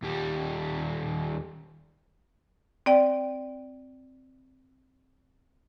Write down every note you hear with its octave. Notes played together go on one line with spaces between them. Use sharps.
D#2 G3
C4 D5 G5